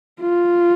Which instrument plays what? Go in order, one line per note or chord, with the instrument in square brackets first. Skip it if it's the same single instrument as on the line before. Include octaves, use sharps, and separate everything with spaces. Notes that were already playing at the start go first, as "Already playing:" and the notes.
[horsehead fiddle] F4